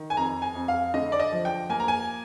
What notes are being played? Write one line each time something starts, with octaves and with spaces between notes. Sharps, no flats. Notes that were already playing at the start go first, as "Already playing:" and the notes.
Already playing: D#3
G#5
F2 A#5
G#5
F2
F5
D3 D#5
D5
D#5
F3
G5
A#3 G#5
A#5
G#5